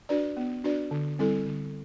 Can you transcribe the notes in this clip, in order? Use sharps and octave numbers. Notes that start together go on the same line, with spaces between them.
D4 F#4 B4 D5
B3
D4 F#4 B4 D5
D3
G3 C4 E4 A4
D3